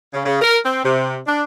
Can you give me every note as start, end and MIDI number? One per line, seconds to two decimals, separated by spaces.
0.13 0.23 49
0.25 0.39 49
0.41 0.56 70
0.65 0.79 60
0.84 1.17 48
1.27 1.42 62